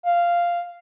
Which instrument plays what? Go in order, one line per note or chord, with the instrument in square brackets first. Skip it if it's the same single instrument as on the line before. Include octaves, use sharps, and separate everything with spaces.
[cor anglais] F5